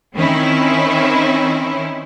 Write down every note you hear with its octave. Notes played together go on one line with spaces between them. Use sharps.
D#3 C4 C#4 E4